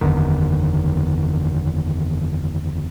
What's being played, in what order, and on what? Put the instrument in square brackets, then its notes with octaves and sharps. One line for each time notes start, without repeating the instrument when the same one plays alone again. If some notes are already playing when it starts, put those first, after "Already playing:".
[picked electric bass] F#1 E2 D3 D#3